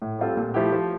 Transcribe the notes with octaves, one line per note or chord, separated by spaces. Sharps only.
A2
G3 C4 F4 A4
A#2
F3 A3 E4 G4
F3